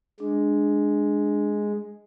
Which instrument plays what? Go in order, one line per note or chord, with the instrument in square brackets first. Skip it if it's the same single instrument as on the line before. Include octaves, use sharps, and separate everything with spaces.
[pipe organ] G#3 [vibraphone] D4